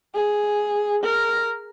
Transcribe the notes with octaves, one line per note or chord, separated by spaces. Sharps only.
G#4
A#4